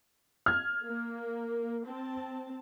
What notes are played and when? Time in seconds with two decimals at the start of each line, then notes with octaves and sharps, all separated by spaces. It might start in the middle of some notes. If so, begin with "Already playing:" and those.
0.46 F6 G#6
0.85 A#3
1.86 C4 A5